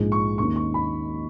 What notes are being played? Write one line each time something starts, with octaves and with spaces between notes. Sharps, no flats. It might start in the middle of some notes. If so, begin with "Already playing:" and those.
Already playing: A#1 G#2 F3 G#3
C#6
D#2 D#3 A#3 C#4 C#6
C#6
B5